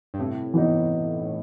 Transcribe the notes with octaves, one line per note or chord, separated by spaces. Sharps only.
G2
A2 C3
E3 B3 D#4